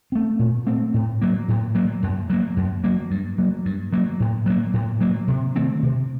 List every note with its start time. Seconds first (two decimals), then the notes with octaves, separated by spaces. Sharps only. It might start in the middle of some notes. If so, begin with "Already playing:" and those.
0.12 A3 C4
0.39 A#2
0.67 A3 C4
0.94 A2
1.22 F#3 A#3
1.49 A2
1.75 F#3 A#3
2.03 F#2
2.30 F#3 A#3
2.57 F#2
2.84 F#3 A#3
3.11 G2
3.38 F#3 A#3
3.65 G2
3.93 F#3 A#3
4.20 A2
4.46 F#3 A#3
4.73 A2
5.01 F#3 A#3
5.28 C3
5.56 D#3 A3 C4
5.83 C3